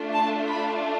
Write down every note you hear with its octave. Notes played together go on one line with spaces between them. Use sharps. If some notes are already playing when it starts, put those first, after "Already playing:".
Already playing: A3 D4 F4
A5
B5